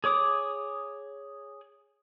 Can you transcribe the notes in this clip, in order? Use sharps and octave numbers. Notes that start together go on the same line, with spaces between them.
G#4 C#5 D6 D#6